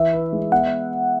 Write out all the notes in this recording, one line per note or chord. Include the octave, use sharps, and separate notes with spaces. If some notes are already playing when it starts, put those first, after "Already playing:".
Already playing: E3 B4 E5
B4
G#3
B3 F#5